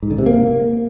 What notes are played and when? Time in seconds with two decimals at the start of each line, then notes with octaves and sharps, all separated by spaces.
0.03 G#2
0.10 D3
0.18 C3
0.26 A#3